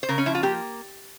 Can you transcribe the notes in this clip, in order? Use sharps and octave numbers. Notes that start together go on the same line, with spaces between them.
C5
C#3 A#4
C#4
F3 E4
F4
A#3 G4